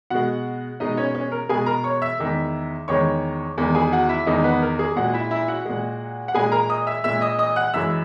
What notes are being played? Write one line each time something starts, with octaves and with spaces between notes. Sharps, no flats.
B2 G#3 F#4 F#5
B2 G#3 D#4 D#5
C#4 C#5
C#4 C#5
A#4
B2 G#3 G#4 G#5
A#4 A#5
C#5 C#6
E5 E6
E2 D#3 G#3
E2 D#3 G#3 C#5 C#6
E2 D#3 G#3
G#4 G#5
F#4 F#5
E4 E5
E2 D#3 G#3 D#4 D#5
B3 B4
A#4
G#4
A#2 G#3 F#4 F#5
E4 E5
E4 E5
F#4 F#5
A#2 G#3
F#5
A#2 G#3 G#4 G#5
A#4 A#5
D#5 D#6
E5 E6
A#2 G#3 E5 E6
D#5 D#6
D#5 D#6
F#5 F#6
F#2 E3 G#3 E5 E6